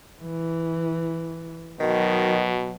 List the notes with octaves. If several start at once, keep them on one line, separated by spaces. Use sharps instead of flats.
E3
B2 D#3 F#3